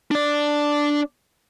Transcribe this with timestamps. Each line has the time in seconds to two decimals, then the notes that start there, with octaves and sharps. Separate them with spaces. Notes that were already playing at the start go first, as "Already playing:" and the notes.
0.11 D4 D5